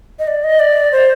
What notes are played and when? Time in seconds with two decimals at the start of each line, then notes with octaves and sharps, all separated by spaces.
0.19 D#5
0.28 D5
0.44 D#5
0.60 D5
0.92 C5